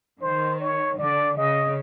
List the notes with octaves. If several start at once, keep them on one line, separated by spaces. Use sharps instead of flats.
D#3 C5
C#5
D3 D5
C#3 D#5